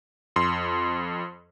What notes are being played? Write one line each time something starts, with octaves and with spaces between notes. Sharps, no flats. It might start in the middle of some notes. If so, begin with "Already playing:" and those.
F2 C6